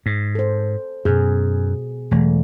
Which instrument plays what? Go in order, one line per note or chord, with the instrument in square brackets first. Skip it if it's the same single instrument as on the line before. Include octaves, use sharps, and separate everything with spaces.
[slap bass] G#2
[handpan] A4 C5
[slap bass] F#2 [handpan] B2 G#4
[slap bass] E1 [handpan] E3 F#3 A3